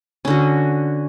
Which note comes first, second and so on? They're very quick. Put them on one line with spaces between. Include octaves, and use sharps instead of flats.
C#4 D3 F#4